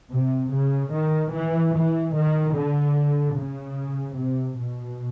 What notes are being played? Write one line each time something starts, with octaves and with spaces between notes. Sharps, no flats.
C3
C#3
D#3
E3
E3
D#3
D3
C#3
C3
B2